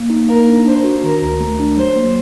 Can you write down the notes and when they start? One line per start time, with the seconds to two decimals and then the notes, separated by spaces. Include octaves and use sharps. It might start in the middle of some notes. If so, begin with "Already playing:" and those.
Already playing: A#3
0.10 D#4
0.28 A#3 A#4
0.48 D4
0.66 D4 C5
0.84 F#4
1.03 D#3 A#4
1.22 D2
1.40 A3
1.59 D4
1.77 F#3 C5
1.96 A#3